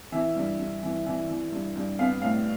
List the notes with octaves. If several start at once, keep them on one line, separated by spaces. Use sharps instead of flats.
E3 E5
G2
G2
E3
E3
E3
G2
G2
B3 F5
A2 F5